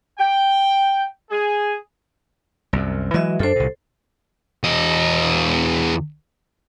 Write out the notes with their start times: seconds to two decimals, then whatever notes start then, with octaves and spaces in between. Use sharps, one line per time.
0.19 G5
1.31 G#4
2.73 C2 F#2
3.14 E3 F#3 G#3 F#4 D#5 E5
3.39 F#2 D4 A4 C5
3.56 C2 A#2
4.64 E2 D#5